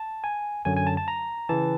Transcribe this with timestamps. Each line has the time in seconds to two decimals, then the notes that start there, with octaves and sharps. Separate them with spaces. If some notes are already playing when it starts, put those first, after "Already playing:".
Already playing: A5
0.24 G#5
0.65 F#2 D3 F#3 G#5
0.76 G#5
0.87 A5
0.97 A5
1.08 A#5
1.49 C#3 E3 A5